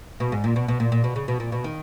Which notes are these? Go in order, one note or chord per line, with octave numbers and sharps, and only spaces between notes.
B2
G#2
A#2
B2
B2
A#2
A#2
B2
C#3
B2
A#2
B2
D#3